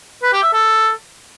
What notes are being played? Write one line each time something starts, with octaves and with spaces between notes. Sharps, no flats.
B4
G4
E5
A4